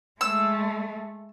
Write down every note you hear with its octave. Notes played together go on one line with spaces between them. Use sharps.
G#3 A3 E6